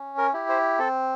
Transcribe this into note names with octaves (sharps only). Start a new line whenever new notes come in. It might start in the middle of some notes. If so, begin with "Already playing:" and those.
Already playing: C#4
A#4
E4 G4
C5
C4 A4